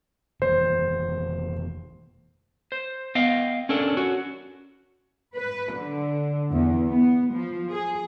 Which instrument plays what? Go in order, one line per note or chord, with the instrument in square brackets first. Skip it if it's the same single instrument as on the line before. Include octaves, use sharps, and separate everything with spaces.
[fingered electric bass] F1 E3 A#3 [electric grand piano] C5
[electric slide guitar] C5
B3 D#5 F5 G5
C#4 D4 A4 A#4
C#4 F#4
[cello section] B4
D3
E2
B3
F3
G#4